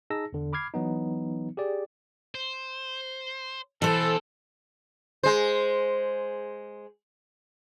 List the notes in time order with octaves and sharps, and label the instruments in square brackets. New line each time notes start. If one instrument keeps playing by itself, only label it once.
[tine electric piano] D#4 G#4 A5 E6 A#6
E2 D3
B5 D6 F6 G#6 C7
E3 F#3 B3 D#4
G4 G#4 D5
[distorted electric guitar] C5
[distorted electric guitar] B2 [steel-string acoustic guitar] E3 C5 [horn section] A4
[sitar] G#3 C5